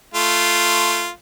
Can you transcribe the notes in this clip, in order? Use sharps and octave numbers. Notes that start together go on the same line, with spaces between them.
A3 F4